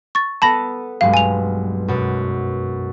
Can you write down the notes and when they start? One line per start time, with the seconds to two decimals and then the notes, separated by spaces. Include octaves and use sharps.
0.15 C#6 A6
0.42 B3 A4 A5 B5 A#6
1.01 B1 G2 G#3 F5
1.14 G#5 F7
1.88 F#2 B2